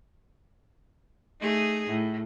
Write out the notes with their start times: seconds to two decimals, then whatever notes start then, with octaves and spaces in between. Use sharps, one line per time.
1.41 A3 D#4 G#4
1.87 A2